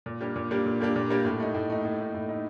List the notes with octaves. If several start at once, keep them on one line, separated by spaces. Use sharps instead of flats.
A#2
G3 A#3 D4 G4
A#2
G3 A#3 D4 G4
A#2
G3 A#3 D4 G4
A#2
G3 A#3 D4 G4
A2
A3 D#4
A2
A3 D#4
A2
A3 D#4
A2
A3 D#4